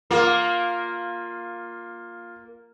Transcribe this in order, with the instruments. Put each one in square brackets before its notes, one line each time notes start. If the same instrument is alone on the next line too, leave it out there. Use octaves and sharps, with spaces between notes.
[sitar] A#3 [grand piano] F4